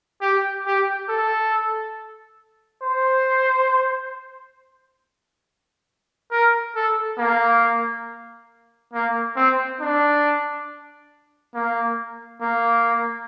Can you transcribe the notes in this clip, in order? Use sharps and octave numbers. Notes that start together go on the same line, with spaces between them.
G4
G4
A4
C5
A#4
A4
A#3
A#3
C4
D4
A#3
A#3